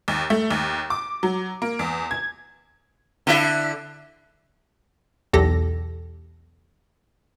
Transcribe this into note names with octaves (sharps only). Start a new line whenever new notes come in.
D#2
A3
D#2
D6
F#3
A#3
E2
G#6
D3 E4 E5
B1 E2 G4 A4 A#6